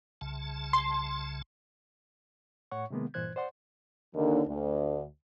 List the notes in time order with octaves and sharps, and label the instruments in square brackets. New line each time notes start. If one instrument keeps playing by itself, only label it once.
[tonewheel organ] C2 C#3 A5
[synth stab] C6
[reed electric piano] A2 C#5 F#5 C#6
C3 D#3 G#3 A#3 B3
G2 A#2 E3 C5 F#6 G#6
C5 D5 F#5 C6
[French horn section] D#2 D3
D2